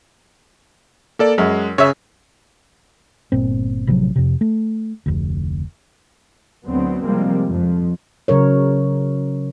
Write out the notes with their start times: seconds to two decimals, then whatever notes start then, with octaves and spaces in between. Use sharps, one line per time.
1.19 A#3 A4 D5
1.38 F#2 G#3
1.78 C#3 C#5 E5
3.32 G1 A#2 C4
3.87 A1 C3 F3 F#3
4.16 F2 C3
4.41 A3
5.06 F1 D2
6.66 D2 F#3 B3 C4
7.04 C3 F3 G3 G#3 A#3 C4
7.48 F2
8.28 C#3 F#3 A#4 C#5